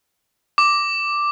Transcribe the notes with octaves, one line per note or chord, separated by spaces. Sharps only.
D6